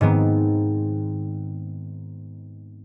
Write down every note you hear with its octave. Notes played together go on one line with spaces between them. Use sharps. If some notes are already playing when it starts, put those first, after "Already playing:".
G#2 D#3 B3 C4